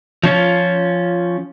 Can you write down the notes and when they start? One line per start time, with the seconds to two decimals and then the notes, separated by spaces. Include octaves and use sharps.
0.23 F3 C#4 F4